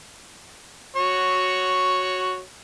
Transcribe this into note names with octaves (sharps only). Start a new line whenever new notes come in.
F#4 C#5